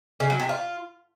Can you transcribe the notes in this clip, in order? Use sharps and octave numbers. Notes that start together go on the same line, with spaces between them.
C#3
F#3
C3
F4